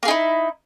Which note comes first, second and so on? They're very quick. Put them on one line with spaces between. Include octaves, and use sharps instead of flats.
A#3 G#4 D#4 E4